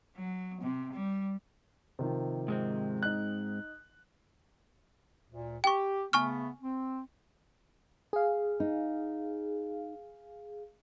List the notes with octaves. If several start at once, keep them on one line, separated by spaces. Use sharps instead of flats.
F#3
C3
G3
C3 D#3 F3
G#2 G#3 C4
D#4 F#6
D2 A#2
G4 G5 C#6
C#3 A3 B3 G#5 C#6 F6
C4
G#4 F5
D#4